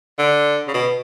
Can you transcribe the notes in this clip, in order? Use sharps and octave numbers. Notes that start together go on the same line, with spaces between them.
D3
C#3
B2